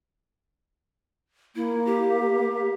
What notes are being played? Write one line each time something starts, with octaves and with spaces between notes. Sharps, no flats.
A#3 E4
G4